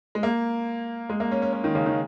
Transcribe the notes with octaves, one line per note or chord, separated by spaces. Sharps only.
G#3
A#3
G#3
A#3
C#4
C#4
C#4
D#3
C#3
D#3